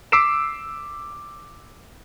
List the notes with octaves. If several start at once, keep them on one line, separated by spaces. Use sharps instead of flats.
D6 E6 B6 C7 D7 E7